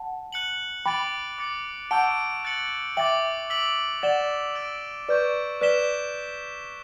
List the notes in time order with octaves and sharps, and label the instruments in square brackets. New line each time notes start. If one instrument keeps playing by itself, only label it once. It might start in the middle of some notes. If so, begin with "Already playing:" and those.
Already playing: [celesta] F#5 A5
[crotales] F#6 C#7 F#7
[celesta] G5 B5 [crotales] D6 A6 D7 F#7
[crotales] D6 A6 C#7 F#7
[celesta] F#5 A5 [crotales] C#6 E6 G6 D7 G7
[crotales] F#6 A6 C#7 F#7
[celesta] E5 G5 [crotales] D6 A6 D7 F#7
[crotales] E6 B6 D7 F#7
[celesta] D5 F#5 [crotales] A6 E7 G7
[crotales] E6 A6 D7 F#7
[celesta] B4 D5 [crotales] C#6 G6 D7
[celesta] B4 D5 [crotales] F#6 B6 E7 G7